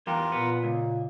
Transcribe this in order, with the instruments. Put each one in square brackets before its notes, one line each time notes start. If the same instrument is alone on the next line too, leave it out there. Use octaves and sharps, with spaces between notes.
[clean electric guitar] E2 G4 [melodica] F4 A#4
[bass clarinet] A#2 [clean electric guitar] B3
[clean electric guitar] C#2 [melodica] A#3